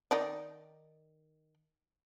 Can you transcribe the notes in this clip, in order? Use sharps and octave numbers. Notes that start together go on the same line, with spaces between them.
D#3 D#4 D5